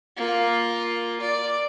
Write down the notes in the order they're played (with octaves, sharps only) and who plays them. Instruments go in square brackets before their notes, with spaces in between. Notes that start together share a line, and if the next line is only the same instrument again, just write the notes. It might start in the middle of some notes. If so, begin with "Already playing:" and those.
[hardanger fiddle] A#3 F4
D5